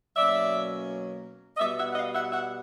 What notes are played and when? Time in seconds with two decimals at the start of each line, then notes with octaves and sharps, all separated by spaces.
0.16 B2 F#3 A#3 C#4 D5 E5
1.56 D#5
1.60 B2 G3 B3 D5 E5
1.78 E5 F#5
1.90 F#5
1.95 D#5 F5
2.14 E5 F#5
2.32 E5 F#5